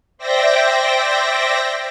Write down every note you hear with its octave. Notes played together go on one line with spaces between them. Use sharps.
C5 D5 E5 G5 A#6